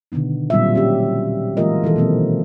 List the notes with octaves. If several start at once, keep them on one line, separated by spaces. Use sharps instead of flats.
B2 D3 D#3 B3 D#4
A#2 F#3 G3 C4 F4 E5
C#4 G4
E3 G#3 A#3 F4 A#4 D#5
D#3 E3 A4
B2 F#3 A#3 C4